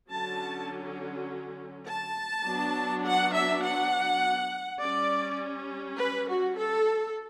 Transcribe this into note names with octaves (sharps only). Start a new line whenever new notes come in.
D3 F#3 C#4 A5
A5
F#3 B3 D4
F#5
E5
F#5
G3 C#4 D5
B4
F#4
A4